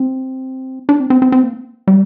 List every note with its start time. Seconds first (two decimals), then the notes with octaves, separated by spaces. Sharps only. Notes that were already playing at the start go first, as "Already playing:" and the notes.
Already playing: C4
0.89 D4
1.00 C4
1.10 C4
1.22 C4
1.32 C4
1.43 A#3
1.87 G3